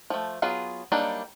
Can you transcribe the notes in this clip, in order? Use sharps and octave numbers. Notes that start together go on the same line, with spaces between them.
F3 A3
F#3 B3 F4 G#4
F#3 G3 A#3 D4 D#4